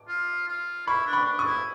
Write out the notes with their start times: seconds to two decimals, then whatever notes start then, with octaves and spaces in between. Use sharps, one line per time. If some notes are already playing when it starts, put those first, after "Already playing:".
Already playing: D6
0.08 F4
0.48 F4
0.87 E4 B5 C#6
1.07 D4
1.13 B5 C#6
1.26 D4
1.39 C#6 D#6
1.46 E4